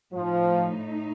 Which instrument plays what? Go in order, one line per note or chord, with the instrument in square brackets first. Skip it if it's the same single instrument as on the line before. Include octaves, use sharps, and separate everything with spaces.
[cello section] A2 A3 D#4 [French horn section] F3